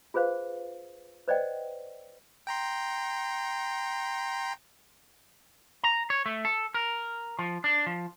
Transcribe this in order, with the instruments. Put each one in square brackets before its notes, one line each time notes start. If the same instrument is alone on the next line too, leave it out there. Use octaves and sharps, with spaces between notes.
[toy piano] F4 G#4 B4 C5 F5
B4 C5 D5 D#5 F#5 G5
[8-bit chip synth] G5 A#5 C6
[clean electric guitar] A#5
C#5
A3
A4
A#4
F3
D4
F3